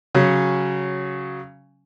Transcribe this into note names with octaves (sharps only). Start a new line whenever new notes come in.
C#3 F#3 C#4